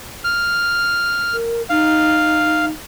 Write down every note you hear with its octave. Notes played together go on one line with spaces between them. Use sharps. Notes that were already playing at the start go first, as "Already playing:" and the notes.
F6
A#4
D#4 F5